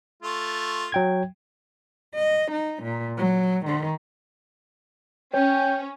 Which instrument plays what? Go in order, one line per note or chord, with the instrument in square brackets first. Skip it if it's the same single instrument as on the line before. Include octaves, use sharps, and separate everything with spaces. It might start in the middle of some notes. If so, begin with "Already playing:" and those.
[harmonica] A3 F4
[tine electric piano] F#3 G5 G#6
[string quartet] D#5
D#4
A#2
F#3
D#3
[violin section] C#4 [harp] C#5 [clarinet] G5